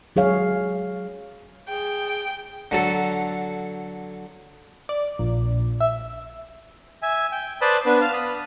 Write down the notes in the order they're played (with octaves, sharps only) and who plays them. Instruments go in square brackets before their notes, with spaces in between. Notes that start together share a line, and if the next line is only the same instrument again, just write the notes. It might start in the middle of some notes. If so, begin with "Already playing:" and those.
[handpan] F#3 G#4 C#5 F5
[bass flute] G#4 [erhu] G5
[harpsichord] D3 F#3 A4
[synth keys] D5
A#1
E5
[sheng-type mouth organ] E5 G#5
G5
B4 C5 D5 A5 B5 D#6
B3 D4 B4
F5 A5
B5 D#6